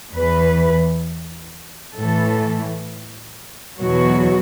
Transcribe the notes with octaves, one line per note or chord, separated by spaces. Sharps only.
E2 E3 B4
A2 E3 A4
E2 B2 F#3 F#4